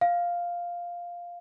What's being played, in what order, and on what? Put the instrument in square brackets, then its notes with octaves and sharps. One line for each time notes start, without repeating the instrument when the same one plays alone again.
[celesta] F5